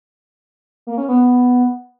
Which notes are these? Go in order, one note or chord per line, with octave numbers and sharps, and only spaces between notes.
A#3
C#4
B3